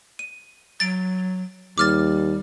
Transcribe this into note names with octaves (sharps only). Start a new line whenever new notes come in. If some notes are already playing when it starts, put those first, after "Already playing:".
D#7
F#3 A6 D7
D#2 G3 D6 F6 A6